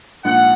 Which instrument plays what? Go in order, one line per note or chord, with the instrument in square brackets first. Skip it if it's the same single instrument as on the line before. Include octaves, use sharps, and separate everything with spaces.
[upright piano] A#1 G#2 F3 A#3 [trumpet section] F#5